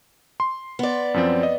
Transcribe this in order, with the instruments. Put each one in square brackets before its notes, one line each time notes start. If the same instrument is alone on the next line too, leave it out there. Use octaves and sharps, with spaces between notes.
[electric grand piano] C6
[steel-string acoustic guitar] B3 D5
[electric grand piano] F#2 F3 C4
D#5